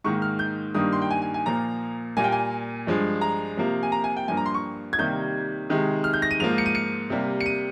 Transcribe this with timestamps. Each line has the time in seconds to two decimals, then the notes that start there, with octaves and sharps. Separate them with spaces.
0.04 G#2 D#3 A#3 C#6
0.22 F6
0.39 G6
0.74 G2 D#3 G3 A#3 D#6
0.92 C6
1.02 G5
1.11 G#5
1.22 G#5
1.34 G#5
1.46 A#2 F3 A#3 A#5
2.17 A#2 G3 A#3 G#5
2.24 G5
2.32 G#5
2.87 G2 F3 G#3
3.21 A#5
3.57 C3 F3 A#3
3.83 G#5
3.92 A#5
4.04 G#5
4.17 G5
4.28 G2 F3 A#3 G#5
4.37 A#5
4.46 C6
4.54 C#6
4.93 G#6
4.99 C3 D#3 G3 A#3 G6
5.69 C3 D#3 G#3
6.04 F6
6.13 G6
6.22 A#6
6.31 D#7
6.39 G#2 F3 A#3 F7
6.58 C#7
6.66 D#7
6.75 C#7
7.10 C3 G3 A#3
7.41 C#7
7.46 D#7